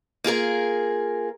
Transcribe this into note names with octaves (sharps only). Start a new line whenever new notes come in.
A#3 F4 G#4 A#4